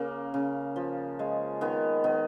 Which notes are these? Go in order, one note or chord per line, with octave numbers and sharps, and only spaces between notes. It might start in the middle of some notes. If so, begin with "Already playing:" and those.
Already playing: C#3 A#3
C#3
F3
G#3
D#3 B3
D#3 B3